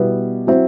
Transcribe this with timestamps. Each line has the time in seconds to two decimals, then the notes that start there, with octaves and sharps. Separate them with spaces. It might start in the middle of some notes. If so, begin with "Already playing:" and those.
Already playing: B2 G3 B3 E4
0.47 F#3 C4 E4